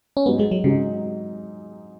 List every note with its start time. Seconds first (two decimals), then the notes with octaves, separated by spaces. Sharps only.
0.17 C#4
0.26 G#2 F#3 B3 D#4
0.39 G#3
0.51 F#3
0.64 G#2 C#3 F#3 D#4